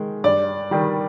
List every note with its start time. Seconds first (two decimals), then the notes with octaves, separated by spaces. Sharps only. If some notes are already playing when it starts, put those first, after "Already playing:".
Already playing: D#3 G#3
0.24 G2 D5
0.71 D#3 G3